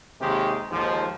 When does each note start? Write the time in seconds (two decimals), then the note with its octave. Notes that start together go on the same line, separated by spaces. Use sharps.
0.20 D#2 C3 D#3 G#3 G4
0.71 D#2 G#2 F3